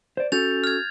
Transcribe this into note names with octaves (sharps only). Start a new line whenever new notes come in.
C5 D5
C#4 F#4 A4 G6 A6 F7
F6 G#6